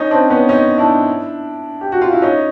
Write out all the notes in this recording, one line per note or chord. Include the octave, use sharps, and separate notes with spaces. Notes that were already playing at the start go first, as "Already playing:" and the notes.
Already playing: C#4 D#4
C4 D4
B3 C#4
C#4 D#4
D4 E4
G4
F#4
F4
E4
C#4 D#4